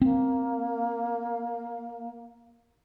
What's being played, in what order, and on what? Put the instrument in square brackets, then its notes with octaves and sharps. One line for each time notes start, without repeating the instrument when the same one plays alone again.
[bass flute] A#3 [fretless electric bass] C4